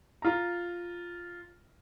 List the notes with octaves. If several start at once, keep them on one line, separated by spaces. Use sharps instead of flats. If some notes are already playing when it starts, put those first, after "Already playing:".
F4 A#5